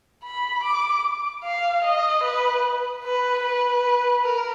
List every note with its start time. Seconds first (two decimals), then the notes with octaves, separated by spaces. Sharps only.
0.24 B5
0.63 D6
1.44 F5
1.84 D#5
2.23 B4
3.04 B4
3.44 B4
4.24 A#4